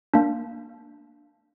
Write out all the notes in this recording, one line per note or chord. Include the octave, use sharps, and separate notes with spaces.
A#3 D4